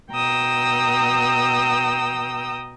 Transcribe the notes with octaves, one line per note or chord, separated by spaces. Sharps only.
B2 G5 A#5 D#6 E6